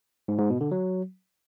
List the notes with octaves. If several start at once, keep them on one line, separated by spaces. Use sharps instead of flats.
G#2
G#2
B2
D3
F#3